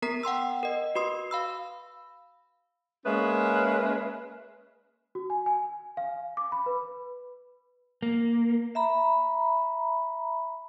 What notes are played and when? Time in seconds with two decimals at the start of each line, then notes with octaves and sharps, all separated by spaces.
0.02 B3 A#4 A#5 B6
0.23 F#5 G5 C6 E6
0.63 A#4 D#5
0.95 F#4 B4 C6 D#6
1.31 F5 B5 E6
3.05 G#3 A#3 C#4 B4 E5
5.15 F#4
5.30 G#5
5.46 G#5
5.97 F5
6.37 D6
6.52 B5
6.66 B4
8.02 A#3
8.75 E5 A#5 B5